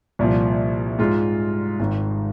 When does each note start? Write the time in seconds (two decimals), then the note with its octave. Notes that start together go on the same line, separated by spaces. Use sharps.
0.19 C2 A#2 F3
0.99 G#2 G#3 F4
1.80 G#1 G#2 D#3